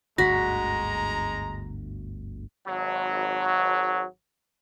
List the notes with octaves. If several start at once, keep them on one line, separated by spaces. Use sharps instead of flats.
G1 D2 G#2 G#3 F#4 A#5 A#6 B6
G#1 F#3